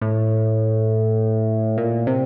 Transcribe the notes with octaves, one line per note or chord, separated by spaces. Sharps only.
A2
A#2
C3